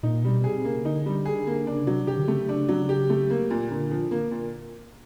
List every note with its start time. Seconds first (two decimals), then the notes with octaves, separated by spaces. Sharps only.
0.03 A#2 D#4
0.23 B2 G3
0.44 C3 G#4
0.65 C#3 A#3
0.85 D3 D#4
1.06 G3
1.25 G#4
1.47 A#3
1.61 D3
1.67 C#3 D4
1.87 C3 F#3
2.07 C3 G4
2.17 D3
2.28 C#3 A3
2.48 C#3 D4
2.69 F#3
2.89 G4
3.10 A3
3.30 A#3
3.50 A#2
3.71 A#2 D3
3.91 F3
4.11 A#3
4.31 A#2